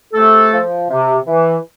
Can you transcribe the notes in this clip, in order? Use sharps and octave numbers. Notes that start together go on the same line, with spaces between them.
C3 A3 A4
F3
C3
E3